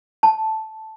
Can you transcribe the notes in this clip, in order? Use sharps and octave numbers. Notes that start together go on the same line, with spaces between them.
A5